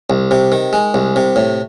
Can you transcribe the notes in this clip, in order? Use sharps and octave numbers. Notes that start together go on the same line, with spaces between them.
C2
C3
D#3
G#3
C2
C3
A2